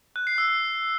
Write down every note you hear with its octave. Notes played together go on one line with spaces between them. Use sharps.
F#6
C7
E6